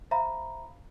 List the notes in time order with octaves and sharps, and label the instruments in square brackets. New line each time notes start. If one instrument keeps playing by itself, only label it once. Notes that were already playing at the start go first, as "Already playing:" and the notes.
[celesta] C5 E5 F5 A#5 B5